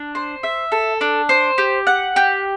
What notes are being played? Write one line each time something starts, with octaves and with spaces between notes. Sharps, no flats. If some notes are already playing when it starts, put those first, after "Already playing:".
Already playing: D4
C5
E5
A4
D4
C5
G4
F#5
G4